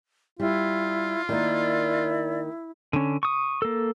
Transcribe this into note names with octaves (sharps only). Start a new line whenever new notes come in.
G3 E4 F4
D#3 A#3 E4 D5
D3 C#4
C#6 D#6
A#3 A4